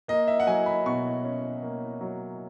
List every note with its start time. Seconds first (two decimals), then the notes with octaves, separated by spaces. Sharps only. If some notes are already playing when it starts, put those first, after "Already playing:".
0.08 A#3 D#5
0.28 E5
0.40 F#5
0.47 F#3 G#5
0.66 B5
0.86 B2 C#6
1.24 C#4
1.63 A#3
2.01 F#3